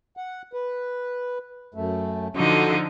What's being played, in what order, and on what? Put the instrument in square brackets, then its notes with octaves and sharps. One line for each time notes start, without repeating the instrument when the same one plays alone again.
[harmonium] F#5
B4
F#2 A3
[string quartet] D3 F3 D#4 [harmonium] F#4 A4